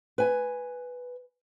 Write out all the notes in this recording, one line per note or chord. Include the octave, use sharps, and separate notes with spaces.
B4 G#5